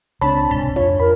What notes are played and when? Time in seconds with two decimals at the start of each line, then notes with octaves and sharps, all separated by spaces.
0.22 C#2 C#3 G#3 C4 D4 C#5 A5 B5
0.51 E1 C2 G#2
0.76 F2 D4 F4 C#5
1.00 F2 A#4 B5